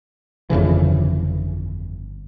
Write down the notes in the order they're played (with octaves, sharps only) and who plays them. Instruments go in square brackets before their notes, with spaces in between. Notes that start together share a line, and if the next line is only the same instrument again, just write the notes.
[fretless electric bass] G1 F2 C#3 E3